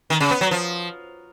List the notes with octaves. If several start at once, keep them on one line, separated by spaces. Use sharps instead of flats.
D#3
C#3
B3
F#3
F3